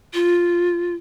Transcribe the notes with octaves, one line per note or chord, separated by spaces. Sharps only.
F4